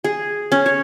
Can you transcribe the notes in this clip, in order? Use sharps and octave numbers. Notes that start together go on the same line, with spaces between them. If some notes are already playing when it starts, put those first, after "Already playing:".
G#4
C#4
C#5